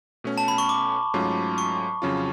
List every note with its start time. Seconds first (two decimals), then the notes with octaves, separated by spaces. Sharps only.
0.24 B2 A3 C#4
0.38 A5
0.48 B5
0.58 C#6
0.69 D6
1.14 G#2 F#3 A3 C#4 F4
1.58 C#6
2.02 F2 C#3 F#3 C#4 F4